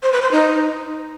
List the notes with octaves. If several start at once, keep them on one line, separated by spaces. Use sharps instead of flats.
C5
B4
C5
D#4